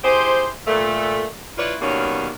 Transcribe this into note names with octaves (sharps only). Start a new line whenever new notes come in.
E4 G4 G#4 C5
A#2 A3
E4 F4 B4 C#5 D5
B2 D#3 F#3 G3 A#3 C#4